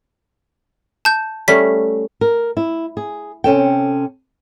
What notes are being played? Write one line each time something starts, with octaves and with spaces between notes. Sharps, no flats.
A5 G6
G3 A3 C#4 B6
A#4
E4
G#4
C3 C#4 A4 G5